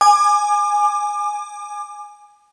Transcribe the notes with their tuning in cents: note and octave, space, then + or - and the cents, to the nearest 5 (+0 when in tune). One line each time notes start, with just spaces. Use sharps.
G#5 +0 D6 +35